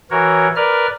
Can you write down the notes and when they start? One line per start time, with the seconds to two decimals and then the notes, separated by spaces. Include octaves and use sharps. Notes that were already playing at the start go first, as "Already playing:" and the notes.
0.11 E3 F#4 A#4 C#5
0.56 A#4 B4 D5 F6